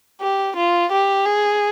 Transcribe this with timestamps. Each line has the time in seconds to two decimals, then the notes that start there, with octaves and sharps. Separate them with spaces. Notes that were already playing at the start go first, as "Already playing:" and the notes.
0.21 G4
0.56 F4
0.92 G4
1.26 G#4